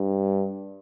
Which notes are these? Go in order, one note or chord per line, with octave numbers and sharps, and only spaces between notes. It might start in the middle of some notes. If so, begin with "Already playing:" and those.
Already playing: G2